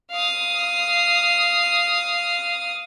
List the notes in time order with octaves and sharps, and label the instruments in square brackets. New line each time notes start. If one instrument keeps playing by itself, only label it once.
[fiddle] F5 D#6